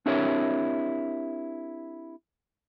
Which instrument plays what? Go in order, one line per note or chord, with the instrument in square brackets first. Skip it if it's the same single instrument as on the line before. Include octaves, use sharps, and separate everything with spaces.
[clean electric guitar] C4 D4 E4 G4 A#4 C#5